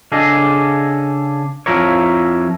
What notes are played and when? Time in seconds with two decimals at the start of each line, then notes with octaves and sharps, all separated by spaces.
0.12 C#3 D4 G#4 A4 D#5
1.66 F2 C3 F3 E4 A#4 C#5